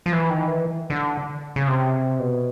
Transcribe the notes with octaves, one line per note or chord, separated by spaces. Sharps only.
F3
E3
D#3
E3
D3
C#3
C3
B2